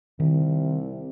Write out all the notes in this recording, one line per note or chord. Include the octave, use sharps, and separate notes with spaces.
C2 D#3